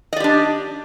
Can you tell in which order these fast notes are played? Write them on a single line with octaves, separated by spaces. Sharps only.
D#5 D5 G4 D4